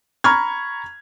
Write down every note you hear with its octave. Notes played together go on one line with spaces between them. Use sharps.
A#5 B5 C#6 F6 G#6